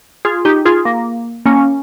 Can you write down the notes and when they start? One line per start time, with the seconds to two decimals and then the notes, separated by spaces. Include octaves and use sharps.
0.25 F4 G#4
0.45 D#4 G4
0.65 F4 G#4
0.85 A#3
1.46 A#3 C#4